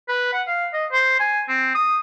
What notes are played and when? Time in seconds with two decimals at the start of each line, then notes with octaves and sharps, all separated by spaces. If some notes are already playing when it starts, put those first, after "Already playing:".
0.08 B4
0.33 F#5
0.47 F5
0.73 D#5
0.92 C5
1.20 G#5
1.48 C4
1.75 D#6